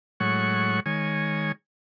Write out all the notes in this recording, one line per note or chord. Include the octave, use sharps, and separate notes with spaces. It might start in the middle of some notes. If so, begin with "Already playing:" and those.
A2 F#3 G#3 C#5 F#5 C#6
D#3 G#3 C#5 G#5